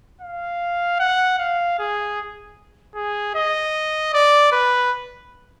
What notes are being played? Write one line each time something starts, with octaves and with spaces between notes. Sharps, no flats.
F5
F#5
F5
G#4
G#4
D#5
D5
B4